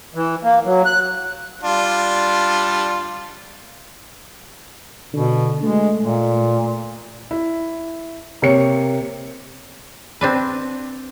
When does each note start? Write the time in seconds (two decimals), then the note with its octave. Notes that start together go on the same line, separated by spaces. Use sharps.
0.15 E3
0.43 A#3
0.65 F#3
0.85 F#6
1.63 G3 D4 F4
5.14 B2 D3
5.63 G#3 A3
6.02 A#2
7.31 E4
8.42 C3 A#3 C#5 C#7
10.21 C4 D4 B4